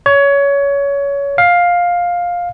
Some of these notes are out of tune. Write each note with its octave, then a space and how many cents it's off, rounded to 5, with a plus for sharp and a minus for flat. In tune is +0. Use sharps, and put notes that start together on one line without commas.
C#5 +20
F5 +10